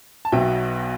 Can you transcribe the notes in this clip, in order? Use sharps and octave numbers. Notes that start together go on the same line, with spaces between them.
A5
B1 B2 F#3 E5 G5